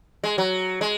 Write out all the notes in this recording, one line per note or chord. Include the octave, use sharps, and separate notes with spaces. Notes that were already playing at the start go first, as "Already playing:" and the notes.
G#3
F#3
G#3